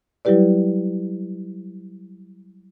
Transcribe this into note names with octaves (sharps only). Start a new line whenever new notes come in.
F#3 G3 E4 G4 B4 D5